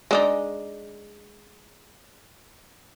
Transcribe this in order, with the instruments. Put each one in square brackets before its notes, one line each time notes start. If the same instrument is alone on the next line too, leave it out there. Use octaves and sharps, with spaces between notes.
[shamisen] G#3 D4 D#4